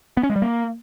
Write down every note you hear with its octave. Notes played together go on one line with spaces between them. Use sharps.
B3
C#4
G#3
G3
A#3